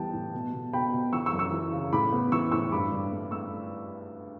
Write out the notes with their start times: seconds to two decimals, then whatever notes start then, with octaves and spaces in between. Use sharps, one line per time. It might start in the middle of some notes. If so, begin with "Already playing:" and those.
Already playing: E3 G3 B3 G5 A5
0.13 A2
0.33 B2
0.53 B2
0.73 B2 G5 B5
0.93 B2
1.12 E3 C#6 E6
1.26 C#6 E6
1.33 F#2
1.39 C#6 E6
1.52 E3
1.72 C#3
1.93 A2 B5 D6
2.12 B3
2.32 E3 C#6 E6
2.52 A2 C#6 E6
2.72 G2 B5 D6
2.92 G2
3.12 A3
3.31 A3 C#6 E6